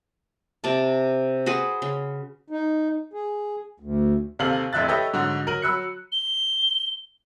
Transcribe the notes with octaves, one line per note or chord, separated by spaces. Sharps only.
C3 D5 A5
F#4 G#4 B4 C5
C#3
D#4
G#4
D2
D#2 C3 C4 A4 F5 F#7
E1 A1 F2 E5 F#6 A6
G4 A4 B4 C#5 D#5 E5
G#2 D3 F#3 F#4
F#3 A#4 D#7 F#7
F#3 B5 E6 F#6 C#7
G7